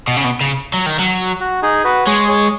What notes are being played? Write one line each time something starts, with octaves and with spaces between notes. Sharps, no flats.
B2
C#3
B2
C#3
F#3
D#3
F#3
F#4
D#4 G#4
F#4 B4
G#3 G#4 C#5
G#4 C#5